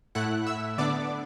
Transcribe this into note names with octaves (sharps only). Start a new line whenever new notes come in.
A2 A3 E4 F#5 F#6
E5 E6
D3 B3 D4 D5 D6